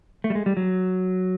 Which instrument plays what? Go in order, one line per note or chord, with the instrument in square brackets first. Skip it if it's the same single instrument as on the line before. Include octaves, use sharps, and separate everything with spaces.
[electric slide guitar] A3
G3
G#3
G3
F#3